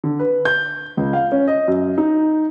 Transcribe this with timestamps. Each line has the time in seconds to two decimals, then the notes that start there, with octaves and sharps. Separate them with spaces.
0.04 D3
0.19 B4
0.45 G6
0.97 C#2
1.13 F5
1.32 C#4
1.47 D#5
1.68 F#2
1.98 D#4